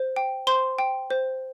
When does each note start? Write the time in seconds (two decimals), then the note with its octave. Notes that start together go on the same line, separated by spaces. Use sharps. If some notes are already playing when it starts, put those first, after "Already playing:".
Already playing: C5
0.16 G5
0.47 C5 C6
0.79 G5
1.10 C5